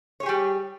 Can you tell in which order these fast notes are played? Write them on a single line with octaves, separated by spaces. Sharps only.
C#5 G#4 G4 G3